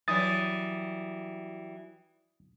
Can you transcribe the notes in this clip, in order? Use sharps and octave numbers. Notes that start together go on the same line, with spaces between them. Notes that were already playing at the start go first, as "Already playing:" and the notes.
E3 F#3 G3 D#6 A6